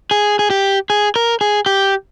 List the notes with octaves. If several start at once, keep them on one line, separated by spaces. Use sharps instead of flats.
G#4
G#4
G4
G#4
A#4
G#4
G4